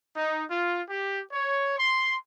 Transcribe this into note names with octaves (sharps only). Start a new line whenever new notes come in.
D#4
F4
G4
C#5
C6